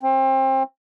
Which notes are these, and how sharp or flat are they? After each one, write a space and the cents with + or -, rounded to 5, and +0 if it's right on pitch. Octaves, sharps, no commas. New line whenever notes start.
C4 +30